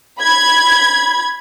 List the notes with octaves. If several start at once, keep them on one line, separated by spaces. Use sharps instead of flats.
B5 G#6